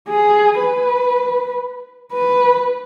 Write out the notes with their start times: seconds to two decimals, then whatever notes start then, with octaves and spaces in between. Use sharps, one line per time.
0.09 G#4
0.60 B4
2.13 B4